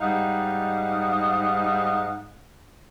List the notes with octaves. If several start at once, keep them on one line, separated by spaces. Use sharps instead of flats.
G#2 G3 D#4 D#5 F5 F#5